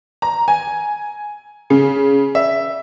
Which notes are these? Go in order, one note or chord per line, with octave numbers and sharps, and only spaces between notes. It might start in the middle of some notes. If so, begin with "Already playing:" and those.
A#5
G#5
C#3
E5